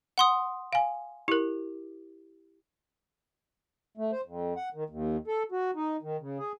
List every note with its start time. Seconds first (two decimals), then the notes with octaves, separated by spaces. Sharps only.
0.18 F#5 C6 D#6
0.73 F5 G#5
1.28 E4 G4 A#4
3.97 A3
4.12 C5
4.26 F2
4.57 F#5
4.74 D#3
4.90 D#2
5.27 A4
5.52 F#4
5.75 D#4
6.02 D#3
6.20 C#3
6.39 G#4